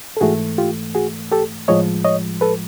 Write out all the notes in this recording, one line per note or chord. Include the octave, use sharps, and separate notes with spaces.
A4
G#2 E3 A3 F#4 G#4
F4 G4
F#4 G#4
G4 A4
A2 F3 G#3 C#5 D#5
C#5 D#5
A4 B4